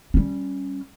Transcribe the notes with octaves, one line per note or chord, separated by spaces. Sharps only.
G3 C#4